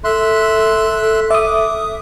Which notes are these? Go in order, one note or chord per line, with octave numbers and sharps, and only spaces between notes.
A4 E5 C6 F#6
E5 D6 D#6